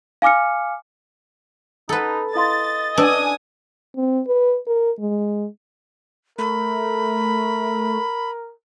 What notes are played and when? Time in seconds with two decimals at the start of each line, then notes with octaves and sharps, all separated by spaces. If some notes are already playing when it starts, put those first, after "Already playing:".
0.22 F5 G#5 D6 F6 C#7
1.89 D#4 A4 B4
2.36 E4 D#5 F5 C6 A6
2.98 D4 B4 G#5 D#6 E6
3.96 C4
4.27 B4
4.67 A#4
4.99 G#3
6.38 A3 A#4 B5